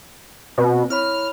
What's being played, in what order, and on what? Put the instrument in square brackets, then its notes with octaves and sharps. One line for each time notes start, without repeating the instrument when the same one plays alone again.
[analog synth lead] B2 [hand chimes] C4
[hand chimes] E4 C#5 B5 [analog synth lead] F6